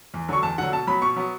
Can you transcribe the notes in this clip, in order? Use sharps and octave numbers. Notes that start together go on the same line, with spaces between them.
E2
D3 F#3 C#6
E2 A5
D3 F#3 F#5
B2 A5
F#3 B3 B5
B2 C#6
F#3 B3